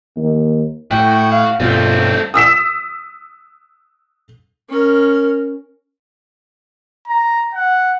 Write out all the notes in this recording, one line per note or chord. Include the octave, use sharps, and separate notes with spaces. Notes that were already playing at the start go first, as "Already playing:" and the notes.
D#2
A2 F#4 G5
F5
G2 B2 A3 C4 F4
D#6 E6 B6 E7
C#4 A#4
A#5
F#5